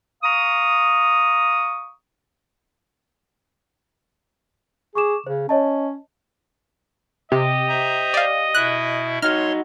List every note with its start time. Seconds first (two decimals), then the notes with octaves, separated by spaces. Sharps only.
0.23 F5 A#5 C#6 D#6
4.95 G#4 C#6 D6 E7
5.27 C#3 C5
5.49 C#4 C#5 D#5 A5
7.32 C3 G4 D#5
7.69 C5 E5 A#5
8.14 D5 F5
8.55 B2 E4 E5 F#6
9.22 D#4 F#4 C#5 C6 F6